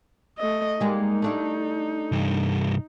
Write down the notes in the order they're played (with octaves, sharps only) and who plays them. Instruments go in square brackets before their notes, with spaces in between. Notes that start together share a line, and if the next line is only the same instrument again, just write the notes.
[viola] A3 D#5
[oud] G3 G#3 A#3 [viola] D#4
[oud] A3 D4 E4
[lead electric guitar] C2 G2